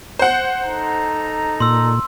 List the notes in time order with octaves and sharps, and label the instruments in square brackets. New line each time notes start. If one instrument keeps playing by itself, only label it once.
[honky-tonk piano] C5 F#5
[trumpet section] D#4 A4 A#5
[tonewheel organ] A#2 [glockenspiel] C6 E6